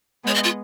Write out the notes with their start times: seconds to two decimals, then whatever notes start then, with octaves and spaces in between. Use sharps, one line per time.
0.24 G#3 B3 C#5
0.35 D#5
0.44 F4